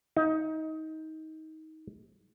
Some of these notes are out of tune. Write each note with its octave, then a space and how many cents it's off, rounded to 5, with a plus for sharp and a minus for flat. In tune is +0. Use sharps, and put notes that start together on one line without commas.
D#4 +20